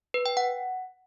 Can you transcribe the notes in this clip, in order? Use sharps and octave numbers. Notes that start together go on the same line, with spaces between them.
B4
G5
F#5